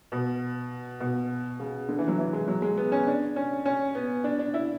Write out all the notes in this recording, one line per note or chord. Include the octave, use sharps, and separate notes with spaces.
B2
B2
C#3
D3
E3
F#3
E3
G#3
F#3
G#3
B3
C#4
D4
C#4
C#4
B3
D4
D4
E4